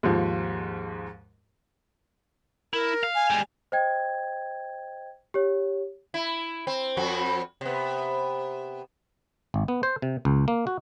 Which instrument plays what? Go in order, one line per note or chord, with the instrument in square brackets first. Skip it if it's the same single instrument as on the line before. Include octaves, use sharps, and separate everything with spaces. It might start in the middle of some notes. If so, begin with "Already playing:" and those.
[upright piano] D#2 G#2 F3
[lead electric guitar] E4 [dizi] A#4
[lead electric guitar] F5
[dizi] G#5
[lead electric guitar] G3 G#3
[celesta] C5 D#5 G5 G#6
G4 C#5
[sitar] E4
C4
F2 C4 F#4
C3 B3
[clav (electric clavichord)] G#1
B3
C5
C3
C#2
A#3
F#4